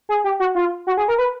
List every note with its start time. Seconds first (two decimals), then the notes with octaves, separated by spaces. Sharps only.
0.09 G#4
0.24 G4
0.40 F#4
0.55 F4
0.87 F#4
0.97 G#4
1.08 A#4
1.18 B4